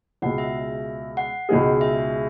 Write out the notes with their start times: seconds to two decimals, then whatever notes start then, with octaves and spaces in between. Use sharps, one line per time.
0.22 C#2 B2 G#3 F#5
0.38 E5
1.17 F#5
1.49 C#2 B2 G#3 D#4 G#4
1.81 E5